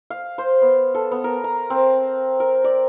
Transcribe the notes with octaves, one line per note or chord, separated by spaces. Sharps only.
F5
C5
B3
A4
B3
A#4
A#5
C4
A#4
D5